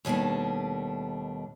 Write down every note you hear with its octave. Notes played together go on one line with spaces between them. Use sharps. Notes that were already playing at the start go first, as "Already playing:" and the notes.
D#2 B2 G3 A3 D4